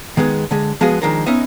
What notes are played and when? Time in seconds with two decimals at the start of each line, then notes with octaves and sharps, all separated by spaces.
0.17 D#3 G#3 B3 G#4
0.51 D3 G#3
0.81 F3 G#3 B3 F#4 G#4
1.02 D#3 F3 G#3 D4 A#4
1.26 B3 C#4 D#4 D#5 E5